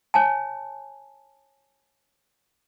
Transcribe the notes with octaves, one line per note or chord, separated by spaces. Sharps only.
C#5 G#5 A5